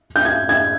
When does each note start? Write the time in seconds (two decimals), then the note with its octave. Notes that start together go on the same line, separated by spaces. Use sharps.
0.16 G6
0.25 G#6
0.49 G#6